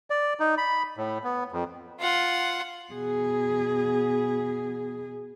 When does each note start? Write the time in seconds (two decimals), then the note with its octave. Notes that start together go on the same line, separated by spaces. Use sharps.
0.10 D5
0.40 D#4
0.58 B5
0.97 A2
1.24 B3
1.52 F2
2.00 F4 F#5
2.93 B2 G#4